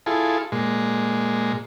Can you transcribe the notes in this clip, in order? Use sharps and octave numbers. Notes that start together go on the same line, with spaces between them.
E4 F4 G#4 A4
A#2 G#3